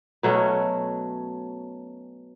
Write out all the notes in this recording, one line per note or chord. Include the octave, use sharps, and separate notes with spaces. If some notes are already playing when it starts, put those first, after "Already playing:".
B2 F#3 A3 C#4